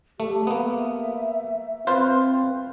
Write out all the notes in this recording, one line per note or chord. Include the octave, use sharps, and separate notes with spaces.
A3 G4
A#3 B3 E5
C4 F4 B4 C5